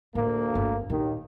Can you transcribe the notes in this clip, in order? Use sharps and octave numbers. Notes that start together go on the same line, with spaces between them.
D2 A2 A#3 F4
G1
D#2 A#2 D#3